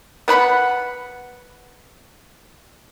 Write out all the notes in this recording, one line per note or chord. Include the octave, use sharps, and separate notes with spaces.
B3 F#5 B5